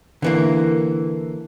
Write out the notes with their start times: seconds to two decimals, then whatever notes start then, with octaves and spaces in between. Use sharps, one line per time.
0.22 D3 E3 A#3